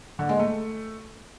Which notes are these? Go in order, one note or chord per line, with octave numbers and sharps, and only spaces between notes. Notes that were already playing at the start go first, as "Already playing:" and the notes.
D3
G#3
A3